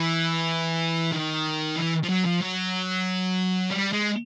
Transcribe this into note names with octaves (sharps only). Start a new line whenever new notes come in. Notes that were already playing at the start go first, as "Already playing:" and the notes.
Already playing: E3
D#3
E3
F3
F#3
F3
F#3
G3
G#3